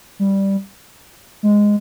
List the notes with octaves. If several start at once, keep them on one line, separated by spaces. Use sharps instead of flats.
G3
G#3